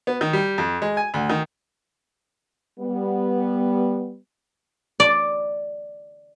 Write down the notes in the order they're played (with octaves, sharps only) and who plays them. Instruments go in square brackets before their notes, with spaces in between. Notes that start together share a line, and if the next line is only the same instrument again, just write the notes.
[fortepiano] B3
D#3
G3
F2
G#3
G#5
D2
D#3
[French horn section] G3 B3
[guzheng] D5